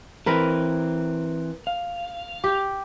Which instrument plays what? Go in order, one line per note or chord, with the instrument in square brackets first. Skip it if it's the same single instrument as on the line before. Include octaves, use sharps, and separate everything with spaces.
[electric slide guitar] E3 C4 [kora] A#4 B4
[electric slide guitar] F5
[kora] G4